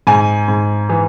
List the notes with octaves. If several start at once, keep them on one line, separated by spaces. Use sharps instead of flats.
G#2 G#5
G#2
E3